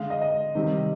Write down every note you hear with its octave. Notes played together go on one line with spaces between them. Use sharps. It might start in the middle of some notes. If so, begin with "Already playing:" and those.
Already playing: D3 G#3 F5
D#5
D#5
C3 D#3 G3